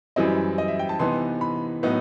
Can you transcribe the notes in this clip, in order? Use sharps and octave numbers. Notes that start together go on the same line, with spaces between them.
F#2 E3 G3 C4 E4 D#5
D#5
E5
G5
A5
C3 E3 B3 D#4 C6
B5
A2 F#3 B3 D#4